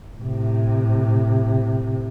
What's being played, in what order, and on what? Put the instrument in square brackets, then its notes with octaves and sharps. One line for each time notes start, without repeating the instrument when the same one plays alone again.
[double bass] A2 C3